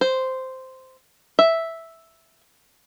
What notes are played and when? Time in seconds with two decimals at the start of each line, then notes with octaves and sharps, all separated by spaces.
0.01 C5
1.39 E5